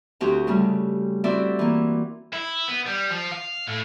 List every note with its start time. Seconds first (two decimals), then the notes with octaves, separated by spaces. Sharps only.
0.21 D2 C4 F#4 G4
0.47 C#3 G3 A3
1.24 C4 E4 F#4 D5 E5
1.59 E3 A#3
2.33 E4
2.69 B3
2.87 G3
3.11 F3
3.31 F5
3.67 A2